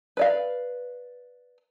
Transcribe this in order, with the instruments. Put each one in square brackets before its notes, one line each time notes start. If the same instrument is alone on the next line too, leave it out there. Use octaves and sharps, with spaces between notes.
[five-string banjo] B4 D5 F5